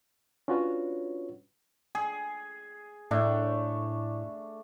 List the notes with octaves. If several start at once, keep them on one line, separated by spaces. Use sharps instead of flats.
C#4 D4 F4 F#4 B4 C#5
G#4
A2 A3 D4